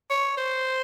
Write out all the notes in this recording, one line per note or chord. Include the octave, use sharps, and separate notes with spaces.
C#5
C5